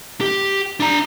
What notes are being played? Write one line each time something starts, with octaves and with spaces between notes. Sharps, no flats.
G4
D4 A#5